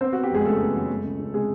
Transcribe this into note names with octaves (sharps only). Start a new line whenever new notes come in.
B3 C4 C5
B3 F#4
G4
F2 G#3 G#4
C#3 A3 A4
B3
F#3
G#3
C#2
C#2
C3 G#3 G#4